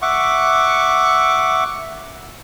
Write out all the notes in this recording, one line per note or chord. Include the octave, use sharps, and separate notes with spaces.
E5 F#5 C#6 D6